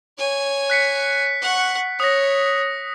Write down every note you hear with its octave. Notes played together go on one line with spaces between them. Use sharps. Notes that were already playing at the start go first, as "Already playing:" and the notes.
C#5 G#5
F#6 B6 C#7
F#5 C#6
C#5 D#6 A#6